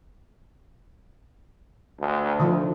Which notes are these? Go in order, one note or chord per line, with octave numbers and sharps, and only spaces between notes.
D2
D3 D#3 F3